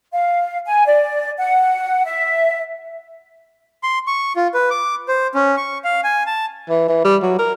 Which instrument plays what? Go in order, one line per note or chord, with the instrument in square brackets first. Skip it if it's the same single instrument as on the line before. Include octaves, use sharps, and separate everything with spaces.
[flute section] F5
G#5
D5
F#5
E5
[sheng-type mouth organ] C6
C#6
F4
B4
D6
C5
C#4
C#6
F5
G#5
A5
[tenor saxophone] E3
E3
G3
F#3
A#4